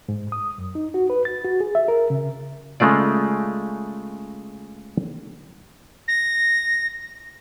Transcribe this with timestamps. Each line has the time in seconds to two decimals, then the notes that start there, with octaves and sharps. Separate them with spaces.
0.09 G#2
0.32 D#6
0.58 F#2
0.75 D#4
0.94 F#4
1.10 B4
1.25 A6
1.45 F#4
1.60 G#4
1.75 E5
1.88 A#4
2.10 C#3
2.80 C#3 G#3 A3 F4 D5
6.08 A#6